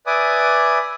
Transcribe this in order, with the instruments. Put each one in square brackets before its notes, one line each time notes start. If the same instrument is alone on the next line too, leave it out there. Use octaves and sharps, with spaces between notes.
[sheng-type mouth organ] B4 D5 E5 G#5 D6 D#6